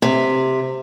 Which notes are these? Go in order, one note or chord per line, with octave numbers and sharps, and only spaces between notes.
C3